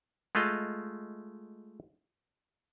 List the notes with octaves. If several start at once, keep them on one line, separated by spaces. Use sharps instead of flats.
G#3 A3 F4 D#5